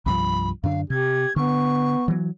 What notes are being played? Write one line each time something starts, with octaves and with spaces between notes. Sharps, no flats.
C2 G2 F3 B5
F#2 D3 D4 F5
C3 G4 G#6
D3 B3 C#6
E3 F#3